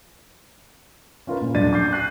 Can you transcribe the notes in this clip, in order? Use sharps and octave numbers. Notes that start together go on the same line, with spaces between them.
C#4 F4 A#4 B4
A#2
D#1 F#3 A3 D4 A6 D#7
D6 G6 C7
F#6 C7 D#7